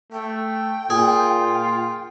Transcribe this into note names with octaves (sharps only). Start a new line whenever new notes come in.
A3 G5
A#2 F4 G#4